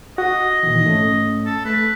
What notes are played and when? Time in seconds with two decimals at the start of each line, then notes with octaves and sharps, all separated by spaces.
0.18 F#4 D#5
0.63 A#2 D#3 E3
0.84 G#2 A3 C#4
1.46 A4
1.65 A3 B4